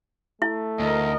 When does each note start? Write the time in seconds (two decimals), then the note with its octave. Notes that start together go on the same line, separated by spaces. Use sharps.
0.42 A3 E4
0.80 D2 A#4 D#5